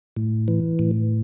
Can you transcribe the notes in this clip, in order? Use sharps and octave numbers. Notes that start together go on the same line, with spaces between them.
A2
E3
A2